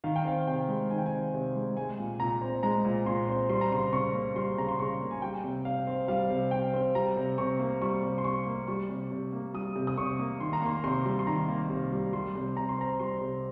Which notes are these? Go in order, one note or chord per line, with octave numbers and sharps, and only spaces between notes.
D#3 F5
G5
C4 F5
C3 G5
G#3
D#3 G#5
G5
G#5
C4
C3
G#3
G#3 G#5
A#2
A#2 A#5
C4
G#3 A#5
A#2
A#2 C6
C4
G3 C6
A#5
C#3 C6
C#3 C#6
A#3
G3 C6
C#3 A#5
C6
C#3 C#6
A#3
G#5
G3 G5
C3
C3 F5
C4
G3 F5
C3
C3 G5
C4
G3 A#5
C3
C3 C#6
A#3
G3 C#6
C3
C6
C3 C#6
A#3
G3 C#6
C3
C3
A#3
G3 D#6
C3
D#6
C3 C#6
A#3
D#3 C6
A#5
A#3 C6
C3 C6
G3
C6
D#3 A#5
A#3
C3
G3
G3 C6
C3
C3 A#5
C6
C4 A#5
G3 C6
C3